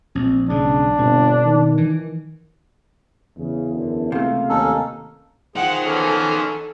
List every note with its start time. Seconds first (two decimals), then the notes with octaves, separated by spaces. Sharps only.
0.15 A#1 C4
0.49 B1 G#2 C#3 D4
0.99 G1 B2 C4
1.46 D#3
1.78 E3
3.38 E2 C#3
3.72 F#2 D3
4.12 C#2 C3 A3 A#3 F5
4.49 D#2 C#4 D#4 A4
5.56 F3 D#4 G#4 C5 F#5 G5
5.86 A#3 B3 C#4 A4